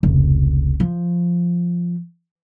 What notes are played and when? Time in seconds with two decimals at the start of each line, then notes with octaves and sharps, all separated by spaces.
0.03 F1 C#2
0.80 F3